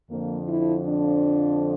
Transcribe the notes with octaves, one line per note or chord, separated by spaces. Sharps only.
F2 D3 F3 A#3
E4
D4